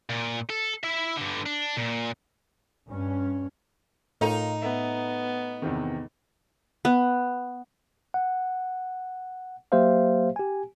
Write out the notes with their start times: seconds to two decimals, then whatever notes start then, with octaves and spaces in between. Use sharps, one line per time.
0.09 A#2
0.50 A4
0.84 E4 E5
1.17 G2 D3
1.46 D4
1.77 A#2
2.89 G2 C#4
4.21 A2 D#4 F4 A#4
4.62 B3 E5
5.62 E2 C3 D#3
6.85 B3
8.14 F#5
9.72 F#3 A#3 G4 C5 E5 F5
10.36 G4 G#5